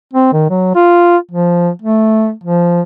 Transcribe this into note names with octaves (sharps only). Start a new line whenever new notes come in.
C4
D#3
F#3
F4
F3
A3
F3